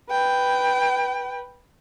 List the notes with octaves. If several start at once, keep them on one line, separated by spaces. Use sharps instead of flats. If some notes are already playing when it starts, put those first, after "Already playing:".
B4 G5